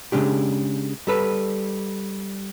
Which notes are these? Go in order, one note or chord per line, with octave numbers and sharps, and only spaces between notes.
C#3 G#3 D4 G4
G3 A4 B4